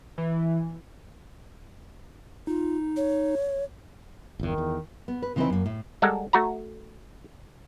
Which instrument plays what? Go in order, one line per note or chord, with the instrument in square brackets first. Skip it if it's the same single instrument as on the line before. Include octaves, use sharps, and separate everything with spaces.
[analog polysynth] E3
[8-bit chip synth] D#4 [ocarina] F4
[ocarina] C#5
[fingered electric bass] G1 E2 [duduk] D#3
[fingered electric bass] E2
[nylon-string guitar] B3
B4
C#3 E3 C4 D#4 E4 B4
F#2 A#3
A2
[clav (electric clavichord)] G3 G#3 A4 A#4 F#5
A3 F#4 A#5